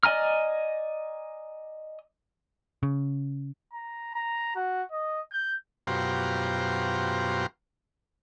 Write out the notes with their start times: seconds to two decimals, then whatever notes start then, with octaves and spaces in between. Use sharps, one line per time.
0.03 D5 D#5 G#5 A#5 F6
2.83 C#3
3.73 A#5
4.14 A#5
4.56 F#4
4.92 D#5
5.32 G6
5.87 F#2 B2 F4 G4 C5 A#5